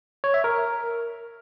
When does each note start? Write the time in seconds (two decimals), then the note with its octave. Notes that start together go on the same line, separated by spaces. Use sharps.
0.24 C#5
0.34 E5
0.44 A#4